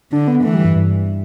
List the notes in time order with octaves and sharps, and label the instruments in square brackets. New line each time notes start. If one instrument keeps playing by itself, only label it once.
[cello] D3 [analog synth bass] D4
[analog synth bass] B3
[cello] E3 [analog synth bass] A3
[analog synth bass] G3
G2
G2